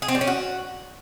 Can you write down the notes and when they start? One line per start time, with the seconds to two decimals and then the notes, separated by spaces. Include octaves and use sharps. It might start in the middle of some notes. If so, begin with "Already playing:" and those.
0.02 G#4
0.08 C4
0.15 G3
0.21 C#4
0.27 F#4